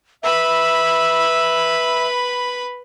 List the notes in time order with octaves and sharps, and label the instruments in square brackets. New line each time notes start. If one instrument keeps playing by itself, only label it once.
[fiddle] B4 B5 [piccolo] E5